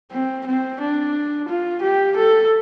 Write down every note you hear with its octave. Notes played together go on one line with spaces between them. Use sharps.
C4
C4
D4
F4
G4
A4